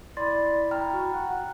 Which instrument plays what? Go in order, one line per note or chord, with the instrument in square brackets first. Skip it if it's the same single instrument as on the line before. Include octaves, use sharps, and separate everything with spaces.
[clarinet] E4 [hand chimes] D5 C6 A6
[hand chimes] G5 A#5 F6
[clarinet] F#4
F#5